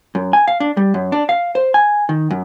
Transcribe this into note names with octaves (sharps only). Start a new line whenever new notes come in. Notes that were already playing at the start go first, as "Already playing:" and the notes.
F#2
G#5
F5
D4
G3
F#2
D4
F5
C5
G#5
D#3
F#2